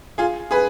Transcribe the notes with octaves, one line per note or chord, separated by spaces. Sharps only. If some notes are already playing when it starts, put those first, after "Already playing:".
F4 G#4
G#4 B4